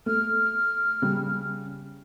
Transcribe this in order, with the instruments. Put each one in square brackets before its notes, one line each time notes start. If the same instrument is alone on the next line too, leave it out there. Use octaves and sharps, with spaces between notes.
[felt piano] A3 [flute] F6
[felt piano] C#3 G3